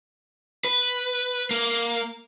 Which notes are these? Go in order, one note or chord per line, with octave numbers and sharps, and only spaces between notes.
B4
A#3